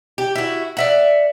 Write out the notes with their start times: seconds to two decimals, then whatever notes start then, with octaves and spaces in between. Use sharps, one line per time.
0.18 G4
0.35 E4 F#4
0.77 D5 E5 F#5